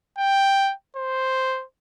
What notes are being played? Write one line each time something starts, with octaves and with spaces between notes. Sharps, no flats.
G5
C5